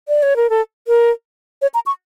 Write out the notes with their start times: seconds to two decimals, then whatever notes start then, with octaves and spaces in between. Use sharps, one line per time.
0.08 D5
0.23 C#5
0.36 A#4
0.50 A4
0.88 A#4
1.62 C#5
1.74 A#5
1.86 C#6